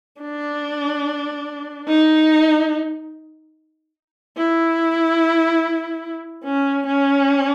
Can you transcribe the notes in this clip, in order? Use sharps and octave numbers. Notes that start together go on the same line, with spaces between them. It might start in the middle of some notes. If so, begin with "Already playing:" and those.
D4
D#4
E4
C#4
C#4